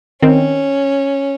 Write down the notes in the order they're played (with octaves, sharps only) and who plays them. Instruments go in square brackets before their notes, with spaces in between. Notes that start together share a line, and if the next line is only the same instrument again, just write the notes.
[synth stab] D#3 C4 [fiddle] C#4